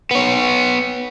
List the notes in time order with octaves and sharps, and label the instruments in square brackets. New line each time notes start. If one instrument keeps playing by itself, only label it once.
[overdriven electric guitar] B3 C#5